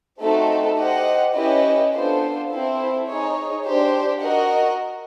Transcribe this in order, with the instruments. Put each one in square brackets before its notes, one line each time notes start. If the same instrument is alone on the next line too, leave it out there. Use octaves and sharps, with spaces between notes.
[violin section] A3 C4 D#4 F#4 A4
G4 C5 D#5 F#5
C#4 E4 G4 B4 D#5
B3 D4 F4 A4 C5
C4 E4 A4 C5
D#4 G#4 C#5
D4 G4 C5
F#4 A#4 D#5 F#5